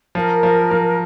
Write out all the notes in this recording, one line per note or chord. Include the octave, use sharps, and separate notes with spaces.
F3 A#4
F3
F3